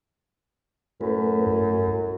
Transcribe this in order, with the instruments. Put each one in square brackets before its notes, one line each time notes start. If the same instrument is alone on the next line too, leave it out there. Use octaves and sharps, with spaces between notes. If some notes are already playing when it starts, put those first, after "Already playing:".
[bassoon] F#2 [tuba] A2 [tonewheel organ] A3 B4
[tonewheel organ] G2